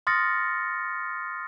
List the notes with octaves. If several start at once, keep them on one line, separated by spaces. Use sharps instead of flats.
C6 D#6 F6 A6 A#6 C#7